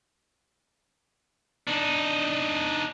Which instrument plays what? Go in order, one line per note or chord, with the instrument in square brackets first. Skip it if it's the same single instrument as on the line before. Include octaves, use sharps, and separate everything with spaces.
[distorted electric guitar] D4 D#4